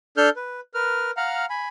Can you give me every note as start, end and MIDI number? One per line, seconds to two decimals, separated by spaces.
0.17 0.30 62
0.17 0.30 69
0.17 0.30 89
0.17 0.30 91
0.36 0.61 71
0.74 1.11 70
0.74 1.11 71
0.74 1.11 89
1.17 1.45 77
1.17 1.45 78
1.17 1.45 82
1.17 1.45 89
1.50 1.69 80
1.50 1.69 83